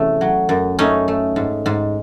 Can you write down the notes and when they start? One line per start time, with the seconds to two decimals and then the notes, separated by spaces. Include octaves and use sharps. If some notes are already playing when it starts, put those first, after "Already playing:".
Already playing: E2 C3 A3 C#4
0.21 F#3
0.49 F#2
0.79 A3 C#4 D#4
1.08 A3
1.36 G#2
1.66 G#2